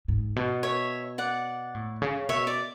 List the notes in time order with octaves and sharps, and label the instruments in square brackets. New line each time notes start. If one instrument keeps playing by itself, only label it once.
[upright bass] G#2
B2
[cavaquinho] C#5 E5
D5 F#5
[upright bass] A2
C#3
[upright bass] B2 [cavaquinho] C#5 E5
[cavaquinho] D5